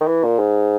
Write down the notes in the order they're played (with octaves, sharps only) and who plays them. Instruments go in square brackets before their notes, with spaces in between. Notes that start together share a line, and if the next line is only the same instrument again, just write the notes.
[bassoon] D#3
E3
A#2
G#2